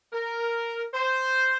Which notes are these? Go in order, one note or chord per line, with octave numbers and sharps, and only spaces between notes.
A#4
C5